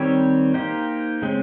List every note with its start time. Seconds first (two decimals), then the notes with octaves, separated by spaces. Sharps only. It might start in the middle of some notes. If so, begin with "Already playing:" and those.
Already playing: D#3 G3 C4 G4 C#5
0.54 A#3 D#4 G4 C5
1.22 C#3 G#3 C4